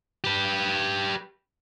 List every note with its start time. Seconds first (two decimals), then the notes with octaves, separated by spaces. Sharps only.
0.24 G4 B4